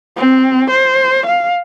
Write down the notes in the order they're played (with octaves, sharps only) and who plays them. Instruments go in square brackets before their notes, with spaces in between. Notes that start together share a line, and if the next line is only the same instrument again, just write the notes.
[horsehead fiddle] C4
C5
F5